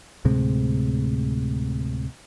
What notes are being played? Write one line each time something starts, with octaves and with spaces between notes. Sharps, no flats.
D2 A2 C3 G#3